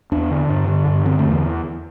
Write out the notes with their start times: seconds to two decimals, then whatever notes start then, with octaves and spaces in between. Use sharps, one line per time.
0.12 E2 D4
0.31 D3
0.49 G2
0.68 D3
0.87 G2
1.06 D3 C4
1.19 A3
1.25 E2
1.31 E3